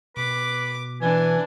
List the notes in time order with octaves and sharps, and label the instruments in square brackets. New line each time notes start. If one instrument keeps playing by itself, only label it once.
[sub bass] B2 [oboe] B4 [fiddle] D6
[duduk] E3 [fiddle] D4 [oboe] G#5